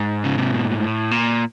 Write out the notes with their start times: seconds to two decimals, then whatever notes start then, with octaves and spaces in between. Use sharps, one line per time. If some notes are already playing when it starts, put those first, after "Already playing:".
Already playing: G#2
0.24 C#3
0.38 C3
0.52 B2
0.65 A#2
0.79 A2
1.11 A#2